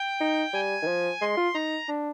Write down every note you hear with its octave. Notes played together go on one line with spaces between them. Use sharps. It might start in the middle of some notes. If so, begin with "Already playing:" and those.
Already playing: G5
D#4
G3 G#5
D#3
F3
G#3 C6
F4
D#4 A#5
D4